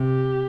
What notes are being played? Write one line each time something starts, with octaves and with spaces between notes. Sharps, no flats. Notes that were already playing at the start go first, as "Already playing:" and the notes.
Already playing: C3 G4